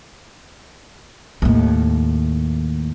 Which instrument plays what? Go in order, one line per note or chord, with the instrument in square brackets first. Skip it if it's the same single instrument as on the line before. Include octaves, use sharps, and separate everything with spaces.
[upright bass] D#2 A2